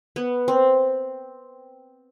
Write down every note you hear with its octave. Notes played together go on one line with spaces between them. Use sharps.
B3
C4